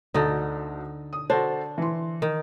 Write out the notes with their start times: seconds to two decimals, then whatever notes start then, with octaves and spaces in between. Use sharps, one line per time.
0.14 D2 D3 D#4 F#4
1.13 D#6
1.30 D4 F#4 A4 C5
1.78 E3 C6
2.22 D#3